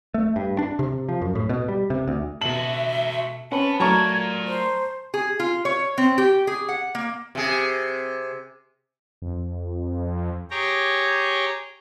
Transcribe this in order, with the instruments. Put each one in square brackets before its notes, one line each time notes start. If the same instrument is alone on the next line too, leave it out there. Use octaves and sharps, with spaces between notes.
[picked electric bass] A3
G2
D4
C3
F3
F#2
A2
B2
G3
C3
D2
[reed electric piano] B2 A5 [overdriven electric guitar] F#4 A4 [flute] E5 [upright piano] F#7
[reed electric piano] C4 C#4 B4 [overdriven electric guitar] F#5 B5 [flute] A5
[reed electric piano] F#3 A3 [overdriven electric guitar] A#4 D5 [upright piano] A5 A#5 C#6 [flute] G#6
[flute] C5
[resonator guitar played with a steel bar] G#4
F4
C#5
C4
G4
G#4
F#5
A#3
[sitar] C3 G#4
[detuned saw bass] F2
[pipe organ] G4 G#4 C#5 G5 A#5